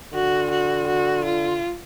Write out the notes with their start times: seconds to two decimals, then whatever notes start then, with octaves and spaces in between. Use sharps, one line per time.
0.14 D3 F#4
0.51 F#4
0.88 F#4
1.25 F4